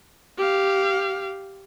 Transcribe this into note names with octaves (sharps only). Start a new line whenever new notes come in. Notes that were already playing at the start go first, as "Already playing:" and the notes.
G4 F5